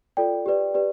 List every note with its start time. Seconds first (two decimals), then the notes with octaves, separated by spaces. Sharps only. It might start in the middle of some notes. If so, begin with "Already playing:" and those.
0.17 F4 A4 D5 G5
0.46 G4 B4 D5
0.74 G4 B4 D5